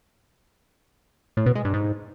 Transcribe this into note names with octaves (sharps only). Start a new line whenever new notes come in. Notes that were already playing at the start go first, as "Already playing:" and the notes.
A2
B2
G#3
G2
G#2